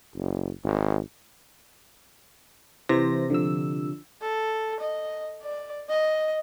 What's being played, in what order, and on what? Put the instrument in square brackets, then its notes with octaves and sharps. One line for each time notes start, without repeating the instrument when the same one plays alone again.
[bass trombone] F#1
G#1
[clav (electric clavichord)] C3 [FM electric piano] E3 C5 A#6
[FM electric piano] D3 F3 E6
[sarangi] A4
D#5
D5
D#5